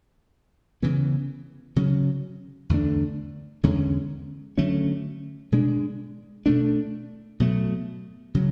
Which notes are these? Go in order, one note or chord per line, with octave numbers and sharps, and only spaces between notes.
C#3 E3 B3
C#3 F#3 C#4
E2 D3 A3 D4
E2 D3 G#3 C#4
D3 F#3 A3 C#4
B2 G#3 D4
B2 A3 D4
B2 F#3 A3
C#3 F#3